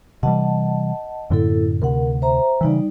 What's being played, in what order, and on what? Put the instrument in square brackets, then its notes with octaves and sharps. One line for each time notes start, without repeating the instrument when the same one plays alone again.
[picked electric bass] C3 E3 G3 [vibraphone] D#5 F#5 A5
[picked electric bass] F#2 A2 D3 [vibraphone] A#3 E4 A4
[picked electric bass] D2 C3 [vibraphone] A#4 F#5
[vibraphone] C5 E5 A#5
[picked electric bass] C#3 E3 [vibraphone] G3 D#4 D5